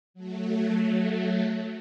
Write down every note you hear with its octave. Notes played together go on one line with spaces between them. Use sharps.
F#3 A3